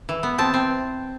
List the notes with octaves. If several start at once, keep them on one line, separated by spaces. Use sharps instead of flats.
E3
B3
C4 A5
C4